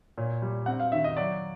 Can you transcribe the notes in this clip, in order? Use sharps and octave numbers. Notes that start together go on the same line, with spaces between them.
A#2 C#5
G3
C4 F#5
F5
D#3 E5
D#5
F#3 D5